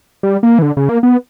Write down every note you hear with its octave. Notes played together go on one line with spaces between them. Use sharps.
G3
A#3
E3
D3
C#3
A#3
B3